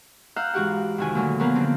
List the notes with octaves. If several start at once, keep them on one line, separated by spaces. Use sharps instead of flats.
F5 F#5 A#5 E6 F#6 G6
G#2 E3 F#4 G4 F#5
F2 C3 D#3 E4 F#4 G#5
A#2 D3 F#3 A3
F3 F#3 A#3 B3 A#4 B4
D3 F3 C4